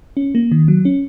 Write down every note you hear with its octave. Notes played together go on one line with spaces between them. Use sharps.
C#4
A#3
D#3
F#3
C#4